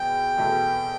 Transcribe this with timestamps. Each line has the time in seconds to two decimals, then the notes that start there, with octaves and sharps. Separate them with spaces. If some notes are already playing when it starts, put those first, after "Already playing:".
Already playing: E2 B2 G5
0.37 E2 B2 A3